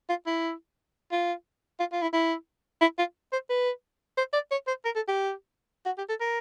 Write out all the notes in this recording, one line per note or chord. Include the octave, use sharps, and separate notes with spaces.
F4
E4
F4
F4
F4
E4
E4
E4
F4
C5
B4
C5
D5
C#5
C5
A#4
A4
G4
F#4
G4
A4
A#4